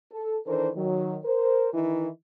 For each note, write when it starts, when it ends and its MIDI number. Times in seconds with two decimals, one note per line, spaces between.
0.12 0.36 69
0.47 0.70 51
0.47 0.70 52
0.47 0.70 62
0.47 0.70 69
0.47 0.70 70
0.47 0.70 72
0.76 1.17 51
0.76 1.17 54
1.25 1.69 70
1.25 1.69 72
1.74 2.08 51
1.74 2.08 52
1.74 2.08 63
1.74 2.08 64